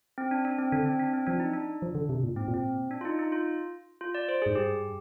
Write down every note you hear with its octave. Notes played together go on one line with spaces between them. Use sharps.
C4
D4
D4
C4
D3 D4
C4
D4
C4
F3 D4
D#4
D4
F3
D3
C3
A#2
G#2 C4
A#2
C4
D4
F4
D#4
D#4
F4
F4
D5
C5
G#2 G#4
G2 G4